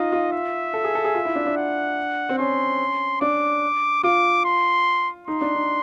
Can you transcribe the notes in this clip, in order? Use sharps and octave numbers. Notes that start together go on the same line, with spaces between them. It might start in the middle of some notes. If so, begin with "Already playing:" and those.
Already playing: D#4 F4 D#5
F4
E5
A4
G#4
A4
G#4
F4
E4
D4
D4
F#5
C4
C#4 C6
D4 D6
F4 D6
C6
D#4 C6
D4
D#4